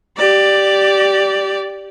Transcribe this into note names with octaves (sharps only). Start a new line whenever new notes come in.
G4 D5